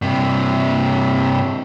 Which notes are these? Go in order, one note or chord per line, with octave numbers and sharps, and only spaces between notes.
G2 C3